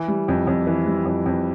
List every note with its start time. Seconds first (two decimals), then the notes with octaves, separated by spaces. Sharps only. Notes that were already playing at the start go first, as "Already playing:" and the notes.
Already playing: E3
0.08 G3
0.28 F2
0.47 F2
0.67 E3
0.87 G3
1.06 F2
1.26 F2